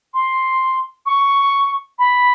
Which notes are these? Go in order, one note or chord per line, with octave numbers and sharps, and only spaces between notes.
C6
C#6
B5